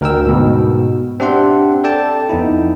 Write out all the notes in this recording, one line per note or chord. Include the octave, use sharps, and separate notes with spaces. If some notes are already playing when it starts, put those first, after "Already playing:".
D2 A#4 G5 E6
G#2 B2
C4 D4 G4 E5 F#5 C6
A4 D5 G5 A5
F2 B3 D#4 E4